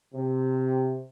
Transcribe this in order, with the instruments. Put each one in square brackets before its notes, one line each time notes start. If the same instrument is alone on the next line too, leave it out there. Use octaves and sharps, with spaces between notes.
[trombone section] C3